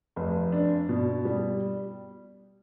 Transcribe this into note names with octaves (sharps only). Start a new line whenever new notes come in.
F1
D4
B2
G3